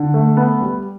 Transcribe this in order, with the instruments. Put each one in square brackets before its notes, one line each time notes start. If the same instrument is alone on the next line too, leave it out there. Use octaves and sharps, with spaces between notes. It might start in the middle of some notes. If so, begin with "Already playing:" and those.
Already playing: [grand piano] D3
A3
B3
G3